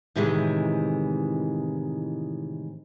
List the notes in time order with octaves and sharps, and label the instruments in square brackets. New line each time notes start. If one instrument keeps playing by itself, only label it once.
[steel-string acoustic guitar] A2 C3 D#3 E3 G#3